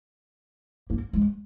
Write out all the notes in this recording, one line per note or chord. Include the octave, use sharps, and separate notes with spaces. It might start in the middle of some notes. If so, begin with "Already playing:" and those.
A#3
G#3